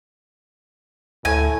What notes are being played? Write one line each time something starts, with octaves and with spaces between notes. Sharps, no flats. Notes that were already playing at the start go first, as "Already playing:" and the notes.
D2 A2 G#5